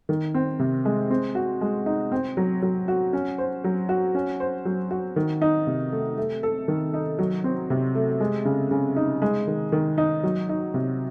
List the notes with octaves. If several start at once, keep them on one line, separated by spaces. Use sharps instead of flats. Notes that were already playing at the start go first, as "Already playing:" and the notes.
D#3
C4
C3
G#3
C4
F#4
G#3
D#4
C4
F#3
F#3
F#4
C#4
C5
F#3
F#4
C#4
C5
F#3
F#4
D#3
D#4
C3
A3
A3
A4
D#3
D#4
F#3
C4
C3
A3
G#3
C#3
C#3
D#4
G#3
D#3
D#3
D#4
F#3
D#4
C3